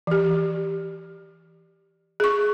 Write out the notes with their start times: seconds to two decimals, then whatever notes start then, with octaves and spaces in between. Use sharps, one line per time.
0.07 E3 G4
2.20 G#4 C#6